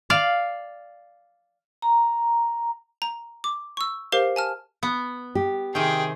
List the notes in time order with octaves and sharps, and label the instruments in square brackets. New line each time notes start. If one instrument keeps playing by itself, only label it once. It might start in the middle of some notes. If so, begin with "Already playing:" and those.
[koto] D5 F5
[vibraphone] A#5
[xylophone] A#5
D6
C#6 E6
G4 A#4 C5 F5 C7
G#5 A5 F6
[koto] B3
[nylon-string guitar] G4
[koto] C3 D#3 [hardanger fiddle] G#4 [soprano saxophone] G5